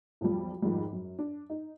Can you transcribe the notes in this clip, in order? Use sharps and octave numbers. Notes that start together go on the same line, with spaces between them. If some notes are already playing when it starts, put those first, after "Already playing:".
B1 F2 F3 G3
F2 G#2 D#3 F3 G3
F#2
D4
D#4